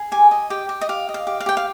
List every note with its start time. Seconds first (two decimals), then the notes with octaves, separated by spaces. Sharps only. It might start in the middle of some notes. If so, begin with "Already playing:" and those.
Already playing: G#4
0.12 G4 G#5
0.31 D#5
0.50 G4 G5
0.69 G4
0.81 D#5
0.89 G4 F5
1.09 D#5
1.14 F5
1.27 G4
1.41 F5
1.46 G4 G5
1.57 F5